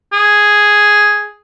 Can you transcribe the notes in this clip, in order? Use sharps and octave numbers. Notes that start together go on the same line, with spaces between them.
G#4